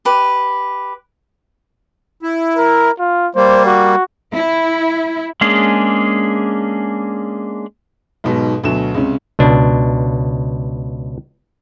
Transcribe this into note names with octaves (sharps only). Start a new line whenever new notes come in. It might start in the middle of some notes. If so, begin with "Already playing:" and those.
G4 B4
E4
A#4
F4
G3 A#3 C5
F#4
E4
G#3 A#3 C#4 D4 G#4
B1 G#2 B2
D2 B2 F#3 E7
C#2 C3 C#4
C#2 B2 D4